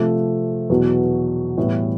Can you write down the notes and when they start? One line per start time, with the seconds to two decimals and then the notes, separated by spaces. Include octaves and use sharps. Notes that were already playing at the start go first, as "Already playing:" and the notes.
Already playing: C3 F3 A3
0.70 E2 B2 F#3
1.57 A2 E3 G3 B3